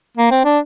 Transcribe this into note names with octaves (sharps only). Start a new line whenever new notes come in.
A#3
C4
D4